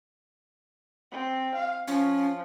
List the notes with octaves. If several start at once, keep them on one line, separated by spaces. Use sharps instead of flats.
C4
F5
F3 C#4